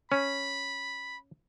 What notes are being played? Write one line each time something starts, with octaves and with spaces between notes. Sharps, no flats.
C#4 B5